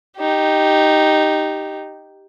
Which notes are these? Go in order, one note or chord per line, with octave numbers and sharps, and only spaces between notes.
D#4 G4